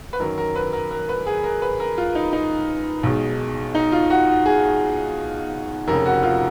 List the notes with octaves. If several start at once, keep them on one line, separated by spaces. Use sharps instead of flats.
B4
F#2 D#3 F#3 A#4
A#4
B4
A#4
A#4
B4
G#4
A#4
B4
A#4
F4
D#4
D#4
B1 B2 G#3
D#4
F4
F#4
F#4
G#4
F1 F2 C#3 A#4
F#4
F4